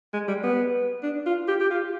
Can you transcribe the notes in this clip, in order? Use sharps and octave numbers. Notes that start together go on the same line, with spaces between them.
G#3
G3
B3
D4
F4
G4
G4
F4